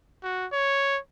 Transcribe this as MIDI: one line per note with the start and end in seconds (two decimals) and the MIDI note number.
0.23 0.46 66
0.52 0.98 73